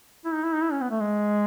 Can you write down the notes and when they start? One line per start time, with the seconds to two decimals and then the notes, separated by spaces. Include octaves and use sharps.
0.25 E4
0.34 D#4
0.44 E4
0.53 D#4
0.62 E4
0.72 C#4
0.81 B3
0.91 A3
1.01 G#3